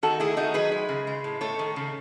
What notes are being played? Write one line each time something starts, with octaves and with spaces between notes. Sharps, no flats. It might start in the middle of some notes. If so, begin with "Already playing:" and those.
D#3 F#4 A4
A3 E4 G#4
D#3 D#4 F#4
F#3 G#4 B4
G#3
C#3
G#3
A2
A3 A4 C#5
D#3
C#3